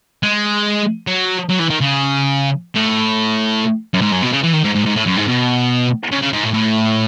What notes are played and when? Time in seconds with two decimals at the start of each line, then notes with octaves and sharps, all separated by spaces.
0.23 G#3
1.07 F#3
1.49 F#3
1.59 E3
1.70 D#3
1.81 C#3
2.75 A2
3.94 F#2
4.01 G#2
4.12 F#2
4.23 B2
4.33 C#3
4.43 E3
4.54 D#3
4.64 G#2
4.75 G#2
4.85 G#2
4.95 A2
5.06 F#2
5.16 G#2
5.28 B2
6.11 C#3
6.22 C#3
6.33 G#2
6.43 A2
6.53 A2